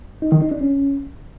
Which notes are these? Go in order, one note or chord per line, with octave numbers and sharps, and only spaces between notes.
D#4
D#3
D#4
D4
C#4